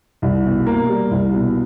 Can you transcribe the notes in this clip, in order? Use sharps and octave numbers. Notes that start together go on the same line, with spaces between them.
C2
B2
A#3
G3
C2
B2